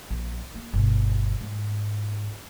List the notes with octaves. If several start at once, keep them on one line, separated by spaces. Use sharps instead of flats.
A#1
A#3
G1 B2
G#2